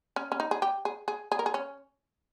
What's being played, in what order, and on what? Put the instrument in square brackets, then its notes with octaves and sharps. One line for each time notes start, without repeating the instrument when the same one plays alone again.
[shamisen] C#4
C#4
D#4
G#4
G4
G#4
G#4
G#4
A#4
G#4
C#4